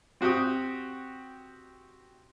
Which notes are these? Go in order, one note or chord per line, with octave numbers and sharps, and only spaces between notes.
C4 F#4 G4 G5 D#6